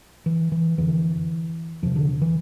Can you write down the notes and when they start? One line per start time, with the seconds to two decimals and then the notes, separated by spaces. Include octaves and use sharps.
0.26 E3
0.52 E3
0.78 F2 D3 E3
1.82 E2 C3 F3
1.96 D3
2.21 E3